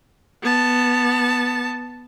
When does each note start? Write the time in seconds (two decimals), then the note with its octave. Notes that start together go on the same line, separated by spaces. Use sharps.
0.42 B3 A5